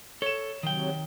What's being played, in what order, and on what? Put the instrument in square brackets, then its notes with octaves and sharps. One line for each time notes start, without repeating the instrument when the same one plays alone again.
[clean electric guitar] A4 [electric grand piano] C#5 E7
[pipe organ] C3 F#3 [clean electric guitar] D#3 G5